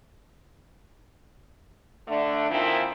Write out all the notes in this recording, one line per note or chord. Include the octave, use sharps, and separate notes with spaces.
D3 A3 D4
A#2 D#3 F3 C4 E4